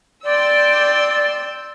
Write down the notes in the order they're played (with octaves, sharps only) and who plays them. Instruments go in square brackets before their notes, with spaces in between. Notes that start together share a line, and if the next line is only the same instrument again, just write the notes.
[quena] D5 [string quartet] G5 C6 E6